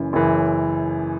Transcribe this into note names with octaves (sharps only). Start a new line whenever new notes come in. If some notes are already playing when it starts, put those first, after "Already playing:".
Already playing: F#1 F#2 E3
F#1 F#2 E3